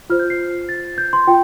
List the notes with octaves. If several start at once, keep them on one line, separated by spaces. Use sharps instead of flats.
F4 C5 F6
G6
C7
A6
G6
C6
F4 G5